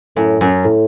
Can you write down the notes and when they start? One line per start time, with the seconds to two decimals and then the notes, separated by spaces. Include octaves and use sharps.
0.16 F#2 A2
0.41 F#2
0.64 A2